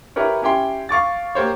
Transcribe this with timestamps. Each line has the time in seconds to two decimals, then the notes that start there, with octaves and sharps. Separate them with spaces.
0.16 E4 G4 A#4 B4 C#5
0.42 C#4 E4 G4 G5 C6
0.89 F5 C#6 D6 A6
1.35 A#3 G4 A#4 C5 C#5